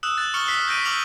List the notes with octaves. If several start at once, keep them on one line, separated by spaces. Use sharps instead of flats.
D#6 E6 F#6 E7
F#6 A6
C#6 D6 F6 C#7 F#7 G7
E6 B6 C7 G7
G6 A#6 C7 D7 D#7
D6 E6 F6 B6 F7 F#7